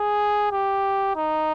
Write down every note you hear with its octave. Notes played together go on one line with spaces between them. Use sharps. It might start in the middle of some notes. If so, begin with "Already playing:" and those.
Already playing: G#4
G4
D#4